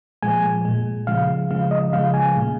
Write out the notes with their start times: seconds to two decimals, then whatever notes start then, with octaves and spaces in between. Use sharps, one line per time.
0.22 A#2 F3 G#3 G#5
0.65 A#2 G#3
1.07 C#3 F3 G#3 F5
1.50 C#3 F3 G#3 F5
1.71 D#5
1.92 C#3 F3 G#3 F5
2.14 G#5
2.36 A#2 G#3